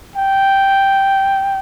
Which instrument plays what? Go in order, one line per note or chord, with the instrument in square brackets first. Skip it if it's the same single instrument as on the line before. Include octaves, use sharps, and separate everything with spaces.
[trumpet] G5